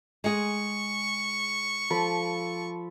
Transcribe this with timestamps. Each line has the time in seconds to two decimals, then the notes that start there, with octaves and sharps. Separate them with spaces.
0.24 G#3 G#4 C#6
1.90 F3 A4 B5